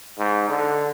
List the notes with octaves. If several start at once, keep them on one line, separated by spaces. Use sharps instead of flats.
G#2
D3